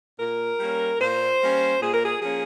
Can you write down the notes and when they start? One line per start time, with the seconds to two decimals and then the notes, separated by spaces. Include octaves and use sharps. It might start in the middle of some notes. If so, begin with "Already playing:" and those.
0.19 A#2 A#4
0.60 G3 A#3 C#4
1.00 A#2 C5
1.41 G3 A#3 C#4
1.82 A#2 G#4
1.93 A#4
2.05 G#4
2.22 F3 A#3 C#4 G#4